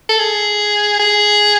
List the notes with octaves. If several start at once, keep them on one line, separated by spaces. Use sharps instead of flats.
A4
G#4
G#4